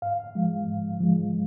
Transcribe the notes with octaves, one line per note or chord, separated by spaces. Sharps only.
G#2 F5
F3 G#3
G#2
F3 G#3